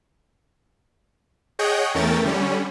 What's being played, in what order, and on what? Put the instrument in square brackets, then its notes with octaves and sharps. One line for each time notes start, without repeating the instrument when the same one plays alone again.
[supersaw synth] G#4 C#5 D#5 F#5 G5 G6
E2 A3 C#4 A#4 G5 A6
D3 G3 C#4